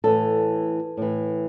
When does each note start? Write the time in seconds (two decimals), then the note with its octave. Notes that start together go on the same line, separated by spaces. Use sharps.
0.04 A2 E3 A4
0.97 A2 E3